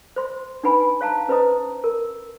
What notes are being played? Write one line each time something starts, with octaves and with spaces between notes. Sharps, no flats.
C5 C6
D4 D#4 B4 F#5 G#5 B5
C#5 F5 A5 A#5
C#4 B4 C5 D#5 A#5 D#6
A#4